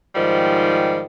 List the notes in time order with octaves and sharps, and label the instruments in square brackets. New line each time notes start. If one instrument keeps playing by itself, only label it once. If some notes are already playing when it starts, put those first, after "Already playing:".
[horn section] G#2 D#3 F3 G3